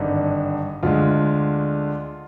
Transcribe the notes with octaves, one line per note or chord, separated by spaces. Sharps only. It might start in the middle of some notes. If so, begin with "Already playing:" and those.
Already playing: G#1 G2 D3 D#4
D2 D3 G#3 F4